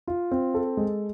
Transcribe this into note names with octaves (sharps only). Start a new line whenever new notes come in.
F4
C4
A4
G#3